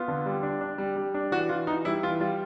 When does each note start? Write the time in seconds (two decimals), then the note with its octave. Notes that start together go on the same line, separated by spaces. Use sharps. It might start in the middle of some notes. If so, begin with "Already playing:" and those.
Already playing: B3 F4
0.08 D3
0.26 G3
0.43 D4
0.61 D4
0.78 G3
0.96 G3
1.14 D4
1.31 E3 F#4
1.49 E3 F4
1.67 E3 D#4
1.85 G3 E4
2.03 E3 F4
2.20 G3 F4